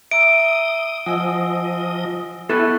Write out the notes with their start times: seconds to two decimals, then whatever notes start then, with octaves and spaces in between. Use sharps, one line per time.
0.11 E5 A#5 D#6 E6 D7
1.06 F3 D#5 F#5 G#5 E6
2.49 B3 E4 A4 B4 C#6 F#6